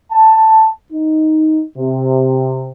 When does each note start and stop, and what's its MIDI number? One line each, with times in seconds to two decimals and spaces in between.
0.12 0.70 81
0.93 1.63 63
1.78 2.71 48